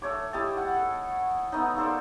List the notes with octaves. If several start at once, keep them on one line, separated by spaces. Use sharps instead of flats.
A3 C#5 D6
E4 G4 D#5 A5
F#5
A4
A3 B3 D#4
A#3 A4 C5 D5